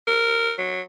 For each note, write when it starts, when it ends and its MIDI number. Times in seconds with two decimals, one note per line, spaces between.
0.07 0.53 70
0.58 0.81 54